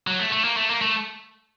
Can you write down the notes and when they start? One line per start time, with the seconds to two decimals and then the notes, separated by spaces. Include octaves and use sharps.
0.07 F#3
0.19 A3
0.32 A3
0.44 A#3
0.57 A3
0.70 A#3
0.81 A3